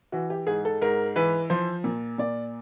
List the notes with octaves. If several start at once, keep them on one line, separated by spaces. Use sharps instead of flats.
E3 F#4
G4
G#2 G#4
A4
G#2 A#4
E3 B4
F3 C5
A#2
A#2 D5